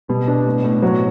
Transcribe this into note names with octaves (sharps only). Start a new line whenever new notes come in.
B2 G3
D4
A2
A2
F#3